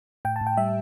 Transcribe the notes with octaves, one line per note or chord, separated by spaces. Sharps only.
A2 G5
A5
A2
G5
G3 E5